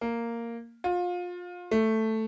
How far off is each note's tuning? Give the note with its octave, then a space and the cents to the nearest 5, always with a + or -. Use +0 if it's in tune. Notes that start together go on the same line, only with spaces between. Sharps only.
A#3 -5
F4 +25
A3 +5